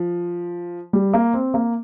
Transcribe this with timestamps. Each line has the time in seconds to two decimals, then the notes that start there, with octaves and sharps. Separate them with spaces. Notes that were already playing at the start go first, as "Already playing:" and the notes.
Already playing: F3
0.93 G3
1.13 A#3
1.34 C4
1.54 A#3